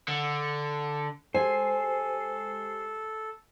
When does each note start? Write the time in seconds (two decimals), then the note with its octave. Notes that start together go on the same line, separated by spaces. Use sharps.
0.08 D3
1.35 G#3 G4 A4 C5 G#5 C7